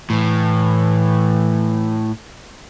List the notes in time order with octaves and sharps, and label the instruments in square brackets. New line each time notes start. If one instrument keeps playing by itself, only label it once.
[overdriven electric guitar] A2 [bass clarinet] E3